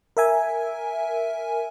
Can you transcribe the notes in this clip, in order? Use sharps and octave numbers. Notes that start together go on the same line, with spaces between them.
A#4 E5 G#5